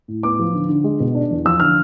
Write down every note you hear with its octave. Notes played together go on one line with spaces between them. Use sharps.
A2
B3 D6
F3
D3
D3
G#3
B2
D4
E2
F3 E6
D3 F6